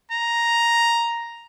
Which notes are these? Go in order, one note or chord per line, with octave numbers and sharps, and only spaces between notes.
A#5